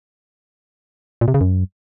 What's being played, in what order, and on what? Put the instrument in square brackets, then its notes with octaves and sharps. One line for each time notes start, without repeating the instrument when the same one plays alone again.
[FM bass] A#2
C3
C#3
F#2